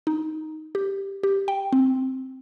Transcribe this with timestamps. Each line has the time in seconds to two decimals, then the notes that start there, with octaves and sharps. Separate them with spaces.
0.07 D#4
0.75 G4
1.23 G4
1.48 G5
1.73 C4